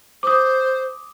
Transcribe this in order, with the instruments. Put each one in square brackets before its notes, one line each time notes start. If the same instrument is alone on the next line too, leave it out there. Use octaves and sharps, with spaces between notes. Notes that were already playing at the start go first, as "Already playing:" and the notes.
[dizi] C5 [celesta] D6 D#6